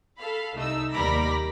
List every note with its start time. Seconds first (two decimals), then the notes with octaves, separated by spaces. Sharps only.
0.19 A4 F5 B5
0.56 C2 A3 D#4 E6
0.93 D#2 G3 A#4 B5 D6 A#6